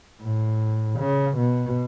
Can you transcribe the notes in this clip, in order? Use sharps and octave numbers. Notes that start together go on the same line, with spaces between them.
A2
C#3
B2